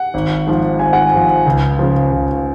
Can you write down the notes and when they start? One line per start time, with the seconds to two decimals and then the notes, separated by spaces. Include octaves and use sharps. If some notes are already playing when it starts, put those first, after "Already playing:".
Already playing: F#5
0.14 G#1
0.47 G#2 F3
0.79 G#1 G#5
0.93 F#5
1.06 G#5
1.13 G#2 F3
1.46 C#2
1.79 C#3 F3
2.11 C#2